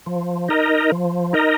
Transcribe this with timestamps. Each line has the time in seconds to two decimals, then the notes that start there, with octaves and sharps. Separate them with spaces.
0.06 F3
0.48 D#4 A#4 D#5
0.92 F3
1.33 D#4 A#4 D#5